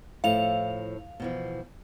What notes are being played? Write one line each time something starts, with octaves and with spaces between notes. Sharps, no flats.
A2 F3 E4 F5 F7
B2 E3 F3